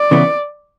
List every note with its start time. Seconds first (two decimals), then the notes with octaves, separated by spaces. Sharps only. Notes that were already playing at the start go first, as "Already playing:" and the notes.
Already playing: D5
0.11 C#3 E3 B3